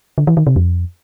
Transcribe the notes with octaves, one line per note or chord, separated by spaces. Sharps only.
D3
E3
D#3
C3
F2